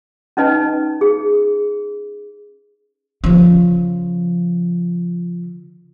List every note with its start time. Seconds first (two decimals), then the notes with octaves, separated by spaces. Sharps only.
0.37 C#4 D#4 B4 D#5 A5
1.01 G#4
3.24 C#3 F3